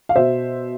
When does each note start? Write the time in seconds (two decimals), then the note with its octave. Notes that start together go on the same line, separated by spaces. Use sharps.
0.09 F5
0.16 B2 C5 E5